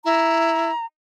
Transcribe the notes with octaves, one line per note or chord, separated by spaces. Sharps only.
E4 A#5